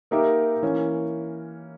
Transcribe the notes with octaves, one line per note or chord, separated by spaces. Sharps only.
A#3 D#4 G4 A#4 E5
E3 A#3 C#4